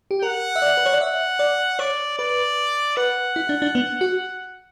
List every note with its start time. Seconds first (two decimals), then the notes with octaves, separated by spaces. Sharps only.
0.11 G4
0.22 A#4 F#5
0.56 E5
0.62 D5
0.77 B4
0.86 C#5
0.93 D5
1.01 E5 F#5
1.39 D5
1.79 C#5 D5
2.18 B4 D5
2.97 B4 F#5
3.36 E4
3.49 D4
3.62 D4
3.75 B3
4.01 F#4